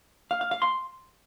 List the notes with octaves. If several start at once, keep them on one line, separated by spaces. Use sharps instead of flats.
F5
F5
F5
C6